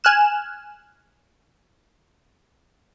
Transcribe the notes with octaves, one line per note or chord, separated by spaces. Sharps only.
G#5 F6 F#6 E7